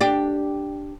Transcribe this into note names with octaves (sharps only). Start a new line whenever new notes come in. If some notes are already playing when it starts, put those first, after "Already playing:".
D4 G4